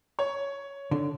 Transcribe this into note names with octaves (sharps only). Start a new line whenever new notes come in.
C#5
D3